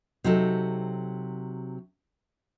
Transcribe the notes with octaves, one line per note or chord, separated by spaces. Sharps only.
C3 F#3 D#4 A4